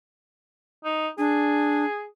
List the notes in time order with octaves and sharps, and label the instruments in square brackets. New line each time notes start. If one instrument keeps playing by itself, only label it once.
[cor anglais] D#4
[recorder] D4 [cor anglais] G#4